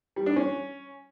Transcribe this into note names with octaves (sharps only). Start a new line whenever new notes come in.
G3
D4
C#4